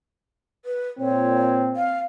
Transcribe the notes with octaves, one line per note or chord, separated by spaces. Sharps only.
B4
A#2 C4 C#5
F5